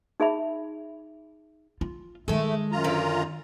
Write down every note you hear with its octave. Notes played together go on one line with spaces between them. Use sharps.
D#4 G#4 E5 B5
F4
D#3 G#3 A3 A4
F#2 F4 A#5
D3 B4